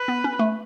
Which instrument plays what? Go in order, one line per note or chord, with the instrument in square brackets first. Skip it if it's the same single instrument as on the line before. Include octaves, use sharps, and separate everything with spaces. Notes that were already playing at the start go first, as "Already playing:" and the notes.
Already playing: [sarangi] B4
[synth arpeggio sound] B3
C#4
A3